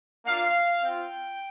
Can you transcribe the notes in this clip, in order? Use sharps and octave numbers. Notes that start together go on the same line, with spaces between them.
A#3 D4 F4 F5
C4 F4 G5